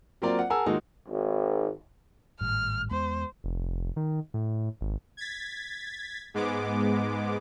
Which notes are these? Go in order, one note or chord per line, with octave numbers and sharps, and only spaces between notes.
F#3 A#3 C4 F4 A#4 D5
F#5
G#4 A#4 F#5 G#5 A5 E6
D#3 G#3 A#3 D#4 F4 F#4
G#1
G#1 A2 G3 F6
E2 G#3 B3 C5
F1
D#3
A2
G#1
G#6 A6 B6
G#2 G#3 B3 D6